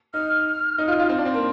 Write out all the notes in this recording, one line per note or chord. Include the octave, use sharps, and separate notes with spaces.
D#4 F6
D#4
F4
F4
C4
D4
C4
A#3